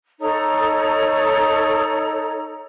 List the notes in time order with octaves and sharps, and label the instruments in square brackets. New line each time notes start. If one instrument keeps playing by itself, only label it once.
[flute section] D#4 A4 C#5 A#5